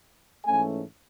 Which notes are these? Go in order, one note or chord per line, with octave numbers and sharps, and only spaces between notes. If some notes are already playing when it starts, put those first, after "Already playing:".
G#2 E3 A3 C#4 G#5